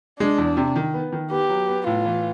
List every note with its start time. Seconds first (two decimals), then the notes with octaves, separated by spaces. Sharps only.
0.20 G#3 D4
0.38 E2
0.57 C3
0.76 D#3
0.94 B3
1.12 D#3
1.31 B3 G4
1.49 F#3
1.68 B3
1.87 A2 F4
2.05 E3